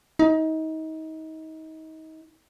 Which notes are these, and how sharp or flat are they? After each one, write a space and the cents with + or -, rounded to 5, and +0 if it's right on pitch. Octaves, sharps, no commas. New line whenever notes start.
D#4 +30